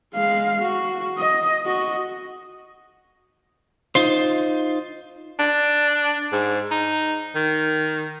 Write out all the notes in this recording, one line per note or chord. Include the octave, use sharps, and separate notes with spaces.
G#3 F5
F#4
D#5
F#4 D#5
D#4 F4 C5
D4
G#2
D#4
D#3